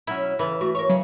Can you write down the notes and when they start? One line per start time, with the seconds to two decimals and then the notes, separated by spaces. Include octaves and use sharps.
0.07 B2 F#3 C#4 E4
0.39 C#3 E3 A4 B4
0.61 A3 F#4
0.75 A#4 C#5 C#6
0.90 C#3 F#3